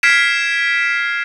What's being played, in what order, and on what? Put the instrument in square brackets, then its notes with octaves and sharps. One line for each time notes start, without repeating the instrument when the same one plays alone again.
[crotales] F6 G#6 B6 C7 D7 E7